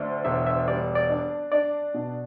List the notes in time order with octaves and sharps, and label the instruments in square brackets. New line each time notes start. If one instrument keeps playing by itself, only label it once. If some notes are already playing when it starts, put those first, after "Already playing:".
Already playing: [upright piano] D2 [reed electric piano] C5 D5 E5
[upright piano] E1 [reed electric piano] E5
[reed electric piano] E5
[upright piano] G3 [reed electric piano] D5
[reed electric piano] D5
[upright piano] D4
[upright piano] D4 [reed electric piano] D5
[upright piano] B2